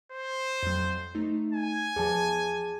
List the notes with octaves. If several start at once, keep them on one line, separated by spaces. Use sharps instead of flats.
C5
F2 F#3
A3 D#4
G#5
E2 F3 G#4 A5